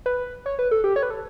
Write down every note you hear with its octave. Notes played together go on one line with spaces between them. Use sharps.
B4
C#5
B4
A4
G4
C#5
B4
A4